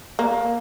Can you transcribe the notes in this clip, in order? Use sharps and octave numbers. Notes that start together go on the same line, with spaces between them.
A#3